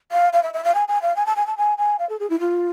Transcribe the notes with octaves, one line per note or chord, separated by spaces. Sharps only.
F5
F5
E5
E5
F5
G#5
G#5
F5
G#5
A5
G#5
A5
G#5
G#5
F5
A4
G#4
E4
F4